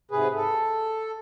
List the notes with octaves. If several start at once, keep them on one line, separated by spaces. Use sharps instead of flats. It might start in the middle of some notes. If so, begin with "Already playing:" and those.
G#2 C3 G#4 B4
A4